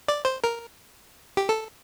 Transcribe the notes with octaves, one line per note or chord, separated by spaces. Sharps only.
D5
C5
A#4
G4
A4